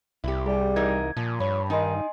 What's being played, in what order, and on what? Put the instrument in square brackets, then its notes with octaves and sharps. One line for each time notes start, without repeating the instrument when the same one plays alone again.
[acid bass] C2 [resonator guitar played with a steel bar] E4 G4
[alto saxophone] G3 [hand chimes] G#4
[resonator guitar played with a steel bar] E3 D#4 A#4 [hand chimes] G#6
[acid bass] A#2 [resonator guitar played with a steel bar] F3
[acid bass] G2 [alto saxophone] C#5 [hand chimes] B5
[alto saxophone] D#3 [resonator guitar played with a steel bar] D#4 [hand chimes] D#5 G#5 C6